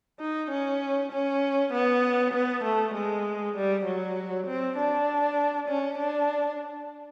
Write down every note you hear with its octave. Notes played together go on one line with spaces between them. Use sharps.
D#4
C#4
C#4
B3
B3
A3
G#3
G3
F#3
C4
D4
C#4
D4